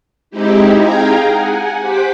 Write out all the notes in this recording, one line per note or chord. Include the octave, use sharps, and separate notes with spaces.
G#3 C4 D#4 E4 G4
G#4 F5 G5 G#5 A#5
F#5 G#5
G4 C5 F#5 D6 B6